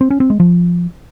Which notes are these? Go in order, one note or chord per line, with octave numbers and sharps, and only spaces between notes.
C4
C#4
C4
G#3
F3